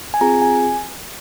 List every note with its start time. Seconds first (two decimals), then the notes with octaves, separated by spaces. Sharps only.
0.14 G#5
0.21 C4 F4 G#4 A#5
0.42 G#5